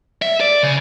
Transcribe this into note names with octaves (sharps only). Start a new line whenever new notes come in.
E5
D5
C#3